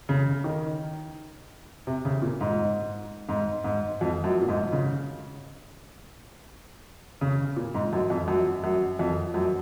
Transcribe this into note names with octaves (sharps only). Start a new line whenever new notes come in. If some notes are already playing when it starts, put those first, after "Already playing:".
C#3
D#3
C3
C#3
A#2
G#2
G#2
G#2
F2
F#2
A#2
G#2
C#3
C#3
A#2
G#2
F#2
F2
F#2
F#2
F2
F#2